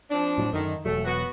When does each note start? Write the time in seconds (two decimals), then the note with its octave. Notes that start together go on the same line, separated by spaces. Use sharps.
0.10 F3 C4 D4
0.38 A2 F#3
0.53 F#2 D3 D#3
0.85 E1 F#3 A3
1.05 B3 F#4